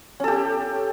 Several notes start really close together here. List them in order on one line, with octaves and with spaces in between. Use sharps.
C#4 A4 G4